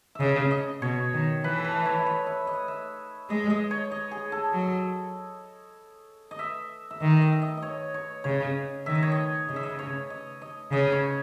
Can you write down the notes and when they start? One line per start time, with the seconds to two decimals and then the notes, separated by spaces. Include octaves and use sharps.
0.15 C#3 D#5 E5
0.51 D#5
0.82 B2 C#5
1.13 D#3
1.43 E3 B4
1.58 A4
1.65 B4
1.86 C#5
2.06 C#5
2.27 E5
2.47 D#5
2.68 E5
3.30 G#3 D#5
3.50 D#5
3.71 C#5
3.91 D#5
4.11 G#4
4.32 A4
4.53 F#3
6.31 D#5
6.39 E5
6.91 E5
7.00 D#3 D#5
7.22 D#5
7.32 E5
7.42 D#5
7.57 D#5
7.62 C#5
7.94 C#5
8.24 C#3 C#5
8.86 D#3 E5
8.95 D#5
9.03 C#5
9.12 D#5
9.49 C#3 D#5
9.56 E5
9.63 D#5
9.79 C#5
10.10 D#5
10.42 D#5
10.72 C#3 D#5
10.92 C#5